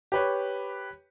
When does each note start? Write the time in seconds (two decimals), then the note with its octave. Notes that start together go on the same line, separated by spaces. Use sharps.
0.12 G4 B4 C#5